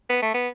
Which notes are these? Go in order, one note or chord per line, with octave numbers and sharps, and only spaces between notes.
B3
A3
B3